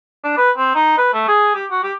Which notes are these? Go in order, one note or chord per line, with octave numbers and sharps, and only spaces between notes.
D4
B4
C4
D#4
B4
A3
G#4
G4
F#4
G4